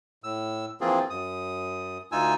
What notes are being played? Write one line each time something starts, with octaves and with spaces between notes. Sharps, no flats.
A2 E6
E3 F3 A#3 C4 F4 G#4
F#2 D#6
D2 D#4 F4 G#5 E6